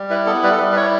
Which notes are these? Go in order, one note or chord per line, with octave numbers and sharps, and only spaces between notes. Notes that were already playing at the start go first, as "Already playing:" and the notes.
Already playing: G3
E4 B4
B3 A4
G3 B4
A4
G3 B4
B4
E4 C#5